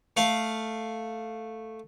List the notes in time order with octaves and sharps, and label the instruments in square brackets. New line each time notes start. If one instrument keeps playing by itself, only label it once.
[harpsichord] A3 F5